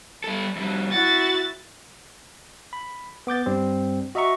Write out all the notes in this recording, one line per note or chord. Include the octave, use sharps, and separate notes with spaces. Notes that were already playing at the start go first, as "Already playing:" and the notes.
G3 A4
F2 G3
E4 F#4 A6
B5
B3 D6 G6 A6
G2 G3 C4
F#4 D#5 E5 A#5 C#6